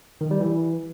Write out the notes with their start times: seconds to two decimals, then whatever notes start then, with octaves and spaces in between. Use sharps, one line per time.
0.21 D#3
0.31 G3
0.41 E3